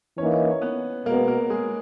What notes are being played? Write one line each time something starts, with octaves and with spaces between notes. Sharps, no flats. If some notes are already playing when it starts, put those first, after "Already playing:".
E3 A#3 C#4 D#4 C#5
C#5
B3 B4
B2 G#3 A#3 B3 A#4
A#3 A#4
G#3 G#4